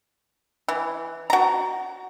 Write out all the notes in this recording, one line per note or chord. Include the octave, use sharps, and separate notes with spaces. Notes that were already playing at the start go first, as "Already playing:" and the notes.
E3
F#4 A#5